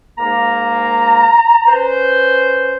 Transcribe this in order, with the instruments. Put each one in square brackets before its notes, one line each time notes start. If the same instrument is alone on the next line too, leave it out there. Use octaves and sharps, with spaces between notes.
[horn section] G#2 A#3 [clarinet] A#5
[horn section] C#4 B4 C5